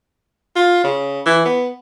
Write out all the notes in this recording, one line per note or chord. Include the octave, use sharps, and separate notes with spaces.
F4
C#3
E3
B3